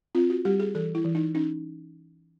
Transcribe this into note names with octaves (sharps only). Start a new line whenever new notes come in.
C4 F4
F#4
G3 G4
G#4
E3 A4
E4
E3
D#4
C#4 D#4